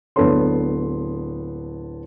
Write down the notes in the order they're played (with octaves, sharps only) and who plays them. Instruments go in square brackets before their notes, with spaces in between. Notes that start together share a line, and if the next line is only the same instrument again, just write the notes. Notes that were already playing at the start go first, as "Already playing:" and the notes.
[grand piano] D1 B3 D4 A4 C#5 C6